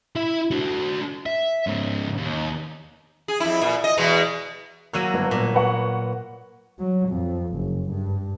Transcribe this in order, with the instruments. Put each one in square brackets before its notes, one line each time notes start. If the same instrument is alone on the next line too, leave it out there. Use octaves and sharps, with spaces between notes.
[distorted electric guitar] E4 E5
D4 F#4
E5
G#2 C#3
D#2
[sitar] G#4
F2 E4
A#2
D#5
E2 B2 G#3
[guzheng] F#3 A#3 C#5 [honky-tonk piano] E6 F#6 D#7
[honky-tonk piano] G1
[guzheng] A#2
[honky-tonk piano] B4 F#5 C#6
[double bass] F#3
F2
F#1
G2